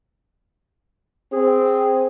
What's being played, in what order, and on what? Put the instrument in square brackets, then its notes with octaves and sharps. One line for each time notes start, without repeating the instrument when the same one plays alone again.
[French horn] C4 [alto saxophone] G#4